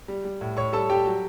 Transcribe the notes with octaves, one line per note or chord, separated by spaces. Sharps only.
G3
G3
A2
A2 C#5 C#6
G3 A4 A5
G3 G4 G5
F#3